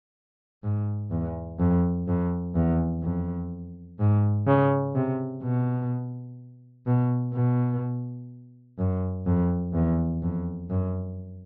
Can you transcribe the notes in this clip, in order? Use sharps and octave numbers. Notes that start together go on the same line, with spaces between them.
G#2
E2
F2
F2
E2
F2
G#2
C#3
C3
B2
B2
B2
F#2
F2
E2
F2
F#2